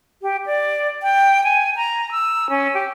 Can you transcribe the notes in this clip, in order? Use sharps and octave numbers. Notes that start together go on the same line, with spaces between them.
G4
D5
G5
G#5
A#5
E6
C#4
G4